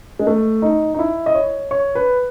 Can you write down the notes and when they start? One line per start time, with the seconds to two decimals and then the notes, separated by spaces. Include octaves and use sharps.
0.19 G#3
0.27 A3
0.62 D#4
0.94 D#4
0.99 E4
1.26 D#5
1.35 C#5
1.71 C#5
1.95 B4